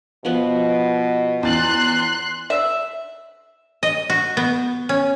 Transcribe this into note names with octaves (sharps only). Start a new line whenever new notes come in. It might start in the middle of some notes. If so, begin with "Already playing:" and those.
B2 F3 B3
E2 C6 F#6 A6 F#7
E5
D#5
F#4
B3
C#4